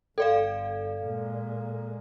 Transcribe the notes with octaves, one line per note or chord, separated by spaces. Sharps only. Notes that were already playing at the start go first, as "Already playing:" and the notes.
G1 A4 D5 F5
A#2 G#3